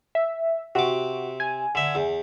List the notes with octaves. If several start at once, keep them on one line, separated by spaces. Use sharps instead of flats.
E5
C3 F#4 D6
G#5
D3 E5
E2